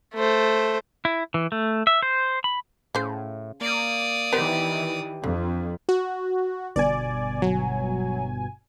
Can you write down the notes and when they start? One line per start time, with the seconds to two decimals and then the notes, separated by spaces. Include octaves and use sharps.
0.14 A3 C5
1.05 E4
1.34 E3
1.52 A3
1.87 E5
2.03 C5
2.44 B5
2.95 A2 C#3 C5
3.61 A#3 D5 D#6
4.33 D#3 E3 B3 G4 A#4 C5
5.24 F2 D3
5.89 F#4
6.76 G1 B2 D5 G#5
7.42 F#3